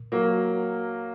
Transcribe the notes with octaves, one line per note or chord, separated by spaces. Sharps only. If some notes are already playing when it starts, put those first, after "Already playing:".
Already playing: A#2
F#3 A#3